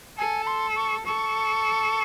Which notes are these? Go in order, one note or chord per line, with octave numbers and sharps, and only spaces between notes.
A4 G#5
A5
C6
C#6
A4 C#6